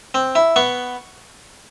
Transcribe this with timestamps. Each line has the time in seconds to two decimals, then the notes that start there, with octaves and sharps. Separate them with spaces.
0.14 C4
0.35 E4
0.56 B3 C#6